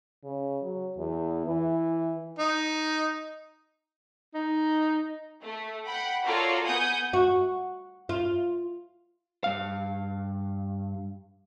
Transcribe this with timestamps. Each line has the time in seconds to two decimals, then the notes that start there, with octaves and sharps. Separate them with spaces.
0.24 C#3
0.62 F#3
0.97 E2
1.47 E3
2.39 D#4
4.34 D#4
5.43 A3
5.85 F#5 G5 B5
6.25 F4 F#4 A4 A#4 C#5 D5
6.65 B3 F#5 G#5 D#6 G6
7.13 F#4
8.09 F4
9.44 G2 F5